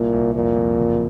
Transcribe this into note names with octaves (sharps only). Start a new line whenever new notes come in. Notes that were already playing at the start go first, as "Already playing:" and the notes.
Already playing: C2 A#2
C2
F2 A#2
F2
F#1